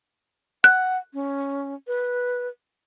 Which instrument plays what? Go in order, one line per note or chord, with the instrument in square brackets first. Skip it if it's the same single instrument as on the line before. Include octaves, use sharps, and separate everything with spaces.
[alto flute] F#5 [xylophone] F#6
[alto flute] C#4
B4